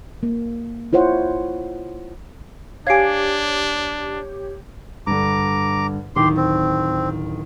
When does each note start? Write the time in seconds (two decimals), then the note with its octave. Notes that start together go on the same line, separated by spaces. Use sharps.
0.23 A#3
0.93 E4 F4 C5 C#5 F#5
2.87 D4 G4 C#5 F5 G#5 G#6 C7 D7
5.07 G2 D3 A#5 D6
6.16 D1 D#3 G4 C6
6.37 C4